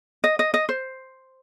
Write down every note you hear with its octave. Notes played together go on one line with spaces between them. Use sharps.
D#5
D#5
D#5
C5